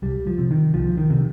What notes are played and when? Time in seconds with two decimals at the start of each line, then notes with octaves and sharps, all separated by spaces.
0.02 C2 G3
0.27 F3
0.39 C3
0.51 D#3
0.74 C2 F3
0.97 D#3
1.10 C3